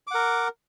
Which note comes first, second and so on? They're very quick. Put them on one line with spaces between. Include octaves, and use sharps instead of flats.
D6 F#5 A#4